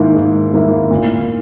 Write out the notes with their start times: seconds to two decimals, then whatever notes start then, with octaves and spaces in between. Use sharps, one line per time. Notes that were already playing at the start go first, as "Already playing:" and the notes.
Already playing: G#2 D#3 A#3 E4
0.14 G#2
0.53 D#3 A#3 E4
0.91 A#2